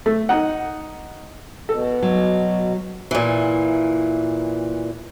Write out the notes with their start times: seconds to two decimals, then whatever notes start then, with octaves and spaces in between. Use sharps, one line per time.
0.06 A3
0.29 D#4 F#5
1.69 B2 A4
2.02 F#3
3.11 A#2 E3